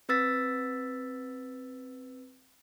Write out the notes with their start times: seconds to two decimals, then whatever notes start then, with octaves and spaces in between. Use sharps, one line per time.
0.09 C4 B4 E6 A6 B6